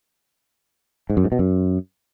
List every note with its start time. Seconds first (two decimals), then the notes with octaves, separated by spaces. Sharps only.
1.10 G#2
1.17 F#2
1.24 G#2
1.32 B2
1.39 F#2